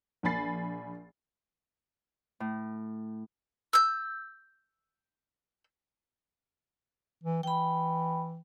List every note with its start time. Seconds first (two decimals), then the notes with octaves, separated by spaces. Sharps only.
0.23 A#1 A#3 G#5 B5 A6 C7
2.40 A2
3.73 E6 G6
7.23 E3
7.43 E3 G5 B5